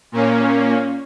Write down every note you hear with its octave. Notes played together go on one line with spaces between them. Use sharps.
A#2 A#3 C#4